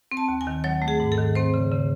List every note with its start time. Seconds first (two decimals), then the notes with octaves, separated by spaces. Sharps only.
0.11 C4
0.17 A5
0.28 D#2
0.41 G#5
0.47 D#3
0.64 F#3 C#5
0.82 A3
0.88 G#4
1.00 G#2
1.12 A4
1.18 D#3
1.35 C4 C5
1.54 C#3
1.72 C#3